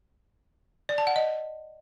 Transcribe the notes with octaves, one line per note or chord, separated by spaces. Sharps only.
D5
A5
F#5
D#5